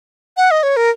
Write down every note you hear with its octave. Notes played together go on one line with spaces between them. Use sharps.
F#5
D#5
C#5
A#4